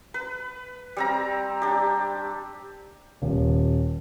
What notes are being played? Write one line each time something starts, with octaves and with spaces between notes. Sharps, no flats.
B4
G3 C4 A#5
D4 G4
D#1